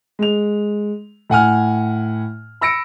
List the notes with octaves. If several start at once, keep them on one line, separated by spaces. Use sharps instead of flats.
G#3 F7
A2 F#5 G#5 F6
B5 E6 A#6 C#7 D7